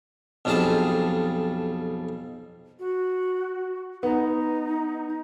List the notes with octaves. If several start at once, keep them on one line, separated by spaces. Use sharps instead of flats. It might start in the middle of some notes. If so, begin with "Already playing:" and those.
B1 F2 G3 F4 G#4 A5
F#4
B3 D#4